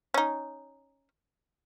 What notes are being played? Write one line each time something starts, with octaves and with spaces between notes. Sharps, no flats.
C#4 D#4